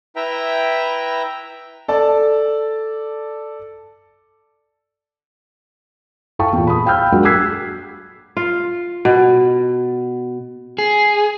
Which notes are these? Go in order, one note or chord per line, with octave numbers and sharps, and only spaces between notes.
E4 B4 E5 G5 A#5
A4 D5 A5
E4 A4 F5 G5 A5 C#6
E2 A#2
B5 D#6
F5 G5 B5 E6 F6 G6
F#3 G#3 D4 F#4 A#4 F#5
D6 E6 F#6 G#6 B6 C7
F4
B2
G#4